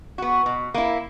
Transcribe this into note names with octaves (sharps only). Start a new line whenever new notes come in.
B3 F#4
B2
A#3 E4